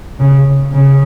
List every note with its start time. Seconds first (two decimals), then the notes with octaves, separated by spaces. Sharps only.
0.20 C#3
0.73 C#3